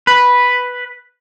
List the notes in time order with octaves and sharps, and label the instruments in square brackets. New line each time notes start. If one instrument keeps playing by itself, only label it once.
[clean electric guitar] B4